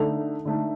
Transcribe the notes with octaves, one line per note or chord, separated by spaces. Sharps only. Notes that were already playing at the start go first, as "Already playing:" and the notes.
Already playing: D3 A3 D#4 A4
D3 A3 D#4